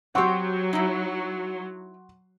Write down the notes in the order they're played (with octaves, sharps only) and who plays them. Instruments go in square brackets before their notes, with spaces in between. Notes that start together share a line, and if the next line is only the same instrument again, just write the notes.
[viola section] F#3 [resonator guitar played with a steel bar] C4 G4 [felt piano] F#5 C6 C#6
[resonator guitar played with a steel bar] D#4 E4